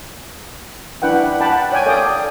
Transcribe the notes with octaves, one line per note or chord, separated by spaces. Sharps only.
D4 E4 B4 F#5 G5
F#5 G5 A5 B5
C#5 D5 G5 G#5
A4 C#5 D5 F5 G5 D#6